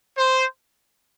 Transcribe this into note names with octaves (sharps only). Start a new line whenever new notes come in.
C5